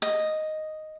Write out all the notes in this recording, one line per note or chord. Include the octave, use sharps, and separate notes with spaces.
D#5